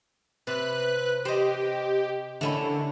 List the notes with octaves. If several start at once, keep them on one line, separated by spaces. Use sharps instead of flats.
C3 B4 F#6
G4 C5 D#5
D3 A3 C#4 E4